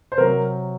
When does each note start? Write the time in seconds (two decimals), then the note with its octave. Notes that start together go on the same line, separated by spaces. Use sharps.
0.12 C5
0.18 C3 F#3 A#4